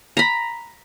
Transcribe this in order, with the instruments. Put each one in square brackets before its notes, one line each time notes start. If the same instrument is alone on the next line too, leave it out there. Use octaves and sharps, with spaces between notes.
[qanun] A#5 B5